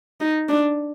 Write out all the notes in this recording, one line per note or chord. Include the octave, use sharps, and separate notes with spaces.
D#4
D4